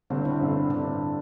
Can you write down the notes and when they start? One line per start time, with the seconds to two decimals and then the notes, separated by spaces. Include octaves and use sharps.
0.10 G1 G2 D3 C4 D4
0.25 E4
0.40 G1 G2 D3 C4
0.70 D3 C4 D4